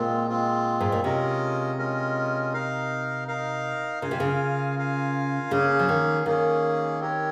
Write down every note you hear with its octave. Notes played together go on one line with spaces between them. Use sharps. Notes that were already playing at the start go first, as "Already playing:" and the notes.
Already playing: A#2 G#3 C4 F4
G#3 C4 F4
G#2
A#2
C3 G#3 C#4 F4 A#4 D#5
G#3 C#4 F4 A#4 D#5
D#4 A#4 F5
D#4 A#4 F5
C#3 F4 A#4 F5 G#5
C3
C#3
F4 A#4 F5 G#5
C#3 A#3 C#4 G#4
F3
D#3
D#3 A#3 C#4 G#4
C4 G4 A#4 C#5